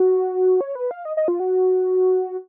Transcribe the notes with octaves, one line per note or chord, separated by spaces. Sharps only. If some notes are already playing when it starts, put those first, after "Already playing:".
Already playing: F#4
C#5
B4
F5
D#5
D#5
F4
F#4